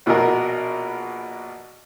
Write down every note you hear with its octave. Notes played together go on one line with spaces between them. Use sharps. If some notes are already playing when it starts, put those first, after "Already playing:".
A#1 B2 B3 F#4 A#4